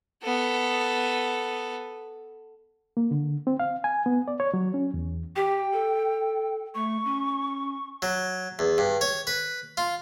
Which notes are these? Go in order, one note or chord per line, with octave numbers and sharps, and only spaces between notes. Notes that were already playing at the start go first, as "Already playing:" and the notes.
B3 A4
A#3
D3
C4
F5
G#5
B3
D5
C#5
F#3
C#4
E2
G4 G5
A4
A3 C#6
C#4
F#3
E2
G2
C#5
B4
F4